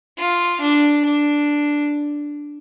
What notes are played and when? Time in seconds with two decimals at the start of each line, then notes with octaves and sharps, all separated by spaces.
0.18 F4
0.61 D4
1.05 D4